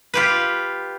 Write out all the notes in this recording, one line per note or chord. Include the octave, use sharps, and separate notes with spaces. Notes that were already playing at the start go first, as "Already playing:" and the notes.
F4 G4 B4